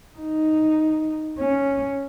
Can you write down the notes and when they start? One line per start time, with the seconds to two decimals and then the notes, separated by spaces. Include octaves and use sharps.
0.19 D#4
1.39 C#4